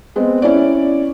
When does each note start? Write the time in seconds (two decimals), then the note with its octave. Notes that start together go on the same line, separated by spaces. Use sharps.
0.16 G#3 B3 C4
0.42 C#4 E4 C#5 D5